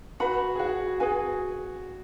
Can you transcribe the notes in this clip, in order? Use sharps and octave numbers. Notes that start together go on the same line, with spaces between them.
F#4 B4 F#5 B5
G#4
F#4
F#4 G#4 B4 G#5